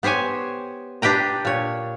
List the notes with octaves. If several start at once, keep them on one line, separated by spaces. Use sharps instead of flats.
B3 G4 C5 C#5 G#5
D4 G4 B4 G5 A#5
A#2 C#5